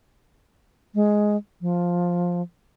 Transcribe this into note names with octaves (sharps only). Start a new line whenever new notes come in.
G#3
F3